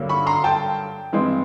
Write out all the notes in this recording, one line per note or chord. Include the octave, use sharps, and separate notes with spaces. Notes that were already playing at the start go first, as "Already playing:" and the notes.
Already playing: G2 D3 F#3 A#3 C#4
B5 C#6
A#5 C6
G5 A5
G2 E3 G#3 C4